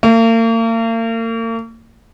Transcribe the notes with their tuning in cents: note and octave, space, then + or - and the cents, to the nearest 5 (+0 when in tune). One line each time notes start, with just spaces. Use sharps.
A#3 -40